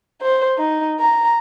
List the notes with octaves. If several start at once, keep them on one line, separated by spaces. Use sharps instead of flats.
C5
D#4
A#5